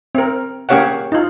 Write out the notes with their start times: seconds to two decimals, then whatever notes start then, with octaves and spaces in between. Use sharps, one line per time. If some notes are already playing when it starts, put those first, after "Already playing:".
0.15 C4 A#4
0.69 A#3 C#4 G4 C#5 F5 F#5
1.12 D#4 F4